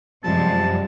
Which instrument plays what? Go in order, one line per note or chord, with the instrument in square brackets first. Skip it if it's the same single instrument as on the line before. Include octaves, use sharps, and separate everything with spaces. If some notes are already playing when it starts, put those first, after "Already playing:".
[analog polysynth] F#2 F3 G3 [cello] C3 G#3 [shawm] A5